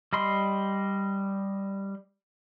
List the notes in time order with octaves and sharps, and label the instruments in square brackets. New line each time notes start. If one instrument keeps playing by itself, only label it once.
[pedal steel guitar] G3 D#5 B5 C6